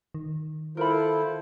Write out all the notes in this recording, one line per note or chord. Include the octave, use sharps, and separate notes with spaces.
D#3
E4 F4 A4 A#4 C5 B5